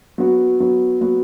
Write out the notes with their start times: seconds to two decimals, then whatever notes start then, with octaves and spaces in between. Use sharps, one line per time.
0.18 F#3 B3 F#4
0.60 F#3 B3 F#4
1.01 F#3 B3 F#4